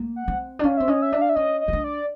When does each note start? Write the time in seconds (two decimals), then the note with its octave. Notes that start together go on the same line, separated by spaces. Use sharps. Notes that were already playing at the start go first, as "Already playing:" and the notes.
Already playing: A#3
0.16 F#5
0.28 C4
0.59 D4
0.64 C#4 F5
0.77 C4 E5
0.88 C#4 D#5
1.02 E5
1.13 D4
1.21 F5
1.29 E5
1.36 C#4 D#5
1.61 D#5
1.68 C#4
1.73 D4
1.84 D5